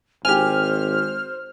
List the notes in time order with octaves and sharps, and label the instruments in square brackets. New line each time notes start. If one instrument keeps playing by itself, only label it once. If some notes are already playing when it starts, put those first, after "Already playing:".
[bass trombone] G#1 [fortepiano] G4 G#5 [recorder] C5 [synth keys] F6